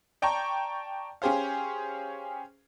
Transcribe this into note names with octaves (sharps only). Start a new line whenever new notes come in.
D5 G5 A5 A#5 C#6
C#4 G4 G#4 C5 F5